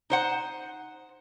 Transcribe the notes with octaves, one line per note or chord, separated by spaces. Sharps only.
D#4 C5 F#5